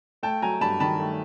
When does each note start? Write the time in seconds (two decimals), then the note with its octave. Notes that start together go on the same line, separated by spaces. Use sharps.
0.23 A3 G5 A5
0.42 F#3 G#5 A#5
0.61 G2 A5 B5
0.80 D#3 A5 B5
0.99 A3